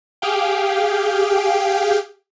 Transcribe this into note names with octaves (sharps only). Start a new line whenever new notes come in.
G4 G#4 F5 G5